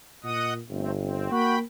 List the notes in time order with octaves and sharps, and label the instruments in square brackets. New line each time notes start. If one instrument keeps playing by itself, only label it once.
[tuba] A#2 [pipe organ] D#5 F#5 D#6
[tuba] G1 [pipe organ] A3 C4
[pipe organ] C4
[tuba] A#3 [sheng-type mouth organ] F#4 [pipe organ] G5 B5